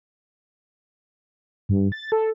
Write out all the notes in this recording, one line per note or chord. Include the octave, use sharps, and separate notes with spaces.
G2
A6
A4